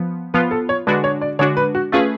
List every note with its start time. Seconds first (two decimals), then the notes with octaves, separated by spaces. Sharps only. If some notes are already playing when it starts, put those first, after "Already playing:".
Already playing: F3 B3
0.34 F3 B3 F4 B4
0.51 A4
0.69 C#5
0.87 D3 G#3 D4 F#4 B4
1.04 C#5
1.21 D5
1.39 D3 G#3 D4 F#4 C#5
1.57 B4
1.75 F#4
1.92 A3 C#4 F4 G#4 B4